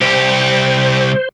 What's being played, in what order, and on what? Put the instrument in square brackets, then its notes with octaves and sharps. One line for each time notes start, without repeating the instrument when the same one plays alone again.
[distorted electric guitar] C2 G4 [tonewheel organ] C5